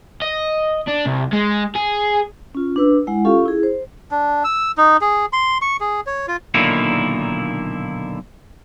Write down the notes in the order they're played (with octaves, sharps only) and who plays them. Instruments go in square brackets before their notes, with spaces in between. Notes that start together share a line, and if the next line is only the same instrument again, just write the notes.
[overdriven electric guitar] D#5
D4
C2
G#3
G#4
[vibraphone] C#4 F4
D4 B4 E6
G#3 E4 F#5
C#4 F4 G4 A4 F5 C#6
E4 G#4
C5
[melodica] D4
E6
D#4
G#4
C6
C#6
G#4
C#5
F4
[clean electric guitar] B1 A#2 D3 D#3 A#3 E4